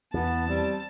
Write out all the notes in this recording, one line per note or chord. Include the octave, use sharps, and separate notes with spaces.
E2 E3 B3 A5
G3 C4